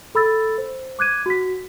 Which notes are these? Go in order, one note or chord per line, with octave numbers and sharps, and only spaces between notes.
A4 B5 E6 A6
C5
D6 F#6 G#6 D#7
F#4 B6